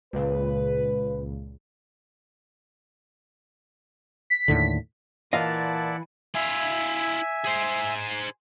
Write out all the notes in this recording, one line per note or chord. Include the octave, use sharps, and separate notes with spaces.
C#2 A#2 C#3 B4
B6
D#2 A2 D3
A#2 E3 E4 D5 D#5 F5 F#5 A5
E4 E5 F5 G#5
G#4 C5